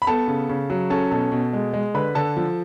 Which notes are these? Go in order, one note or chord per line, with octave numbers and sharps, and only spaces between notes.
B5
B3 A4 A5
C#3
C#3
F#3
C#4 A4 A5
B2 A4 A5
B2
G#3
G#3
D3 B4 B5
D3 A4 A5
F3